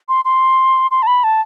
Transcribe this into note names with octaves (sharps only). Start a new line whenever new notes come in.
C6
C6
C6
A5
B5
A5